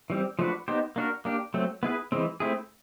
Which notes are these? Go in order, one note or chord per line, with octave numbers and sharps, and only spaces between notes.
E3 G3 C4
F3 A3 D4 F#4 B4
B3 D#4 G4 C5
A#3 D4 F#4 A#4
A#3 D4 G4
F#3 A3 C4
B3 E4 G#4 B4
E3 G#3 C4
A3 C4 E4 G#4